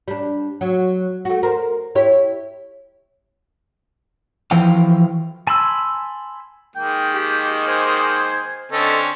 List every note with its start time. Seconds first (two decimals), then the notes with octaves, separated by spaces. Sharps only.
0.08 G3 D4
0.61 F#3
1.25 A3 F#4
1.43 A#4 C5
1.95 E4 G4 C#5
4.51 E3 F3 F5 G5
5.47 G#5 A5 B5 C6 E6
6.76 D#3 G#3 A#3 G5
7.15 G4
7.68 C5 G#5
8.72 D3 C4 C#4 A4 D#5